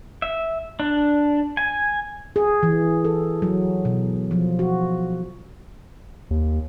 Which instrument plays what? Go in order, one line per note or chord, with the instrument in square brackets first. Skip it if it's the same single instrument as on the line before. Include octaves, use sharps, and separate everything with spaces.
[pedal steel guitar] E5
D4
G#5
[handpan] G#4
E3
A4
F#3
B2
F3
F#4
[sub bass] D#2